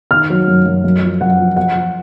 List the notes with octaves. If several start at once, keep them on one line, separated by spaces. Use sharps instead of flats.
D#3 F6
F#3
F#2
F#2
F#2
F3
F#2 F#5
F3
F3 F#5
F3